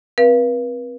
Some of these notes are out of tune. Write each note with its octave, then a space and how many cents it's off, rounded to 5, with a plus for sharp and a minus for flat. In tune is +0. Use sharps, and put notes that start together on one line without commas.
C4 +0 B4 -40 F5 -30